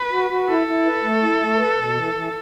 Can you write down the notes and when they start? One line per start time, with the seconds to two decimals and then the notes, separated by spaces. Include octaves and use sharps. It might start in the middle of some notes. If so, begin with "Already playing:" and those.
Already playing: B4
0.12 F#4
0.30 F#4
0.49 E4 A4
0.67 E4
0.86 B4
1.04 A3
1.22 E4
1.40 A3
1.59 B4
1.77 B2
1.95 E3
2.14 E3